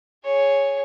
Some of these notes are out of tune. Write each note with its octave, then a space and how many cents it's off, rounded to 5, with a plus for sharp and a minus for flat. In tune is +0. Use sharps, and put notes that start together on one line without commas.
G#4 -5 C#5 +0